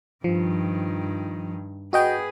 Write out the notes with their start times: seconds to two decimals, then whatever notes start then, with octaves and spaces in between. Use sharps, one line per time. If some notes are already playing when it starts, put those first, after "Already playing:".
0.24 G2 D#3 F3
1.93 F#4 G#4 B4 D#5 G5